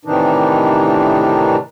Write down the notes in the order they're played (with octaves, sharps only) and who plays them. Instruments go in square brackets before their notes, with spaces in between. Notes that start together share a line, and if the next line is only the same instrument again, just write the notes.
[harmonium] A2 C3 D#3 E3 D4 D#4